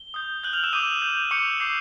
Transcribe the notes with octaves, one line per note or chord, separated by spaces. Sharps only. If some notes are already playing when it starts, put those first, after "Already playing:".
Already playing: G7
D#6 G6
D#6 F#6 G6 F#7
F6 F7
E6 E7
D6 D#6 G6 D#7
D6 G6
C#6 D6 G6 C#7
D6 G6 C7